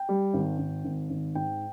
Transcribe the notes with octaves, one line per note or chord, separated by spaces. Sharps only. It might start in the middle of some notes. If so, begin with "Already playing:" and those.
Already playing: G5
G3
G#1
G#1
G#1
G#1
G#2 G5